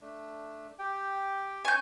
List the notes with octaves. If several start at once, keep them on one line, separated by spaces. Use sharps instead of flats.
A3 D4
G4 G5
C#4 G#5 C#6 G6